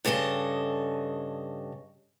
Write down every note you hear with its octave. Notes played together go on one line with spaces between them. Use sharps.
G2 C#3 G#4 A4 D#5